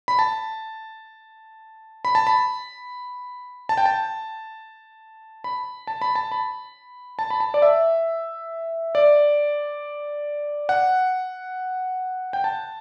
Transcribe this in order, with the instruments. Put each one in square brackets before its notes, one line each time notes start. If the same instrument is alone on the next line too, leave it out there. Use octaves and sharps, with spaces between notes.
[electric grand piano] B5
A5
B5
A5
B5
A5
G5
A5
B5
A5
B5
A5
B5
A5
B5
A5
D5
E5
D5
F#5
G5
A5